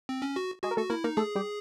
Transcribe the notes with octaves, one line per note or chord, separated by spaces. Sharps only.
C4
C#4
F#4
G#3 F#4 G#4
A#4
A3 F#4 A4
A#3 E4 A#4
A#3 D#4 A#4
A3 G#4 A4
G3 G4